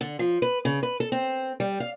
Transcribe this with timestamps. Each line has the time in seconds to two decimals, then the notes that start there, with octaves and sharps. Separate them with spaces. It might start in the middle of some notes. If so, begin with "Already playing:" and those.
0.01 D3
0.19 F3
0.42 B4
0.65 C#3
0.83 B4
1.00 A4
1.12 C4
1.60 G3
1.80 F5